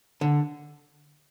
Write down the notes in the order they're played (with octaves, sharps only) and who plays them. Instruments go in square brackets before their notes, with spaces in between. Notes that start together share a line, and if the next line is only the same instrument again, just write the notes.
[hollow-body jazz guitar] D3